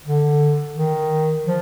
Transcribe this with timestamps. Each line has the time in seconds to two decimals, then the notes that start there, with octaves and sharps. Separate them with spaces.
0.06 D3
0.76 D#3
1.47 F3